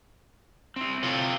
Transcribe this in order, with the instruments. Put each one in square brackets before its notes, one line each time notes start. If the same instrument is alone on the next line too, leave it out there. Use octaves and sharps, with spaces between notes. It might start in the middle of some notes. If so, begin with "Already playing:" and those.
[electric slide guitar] C4 E4
[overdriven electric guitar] C3 [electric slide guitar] F4 A4 C#5